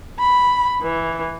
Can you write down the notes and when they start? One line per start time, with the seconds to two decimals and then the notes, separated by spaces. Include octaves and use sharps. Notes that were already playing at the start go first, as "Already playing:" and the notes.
0.20 B5
0.82 E3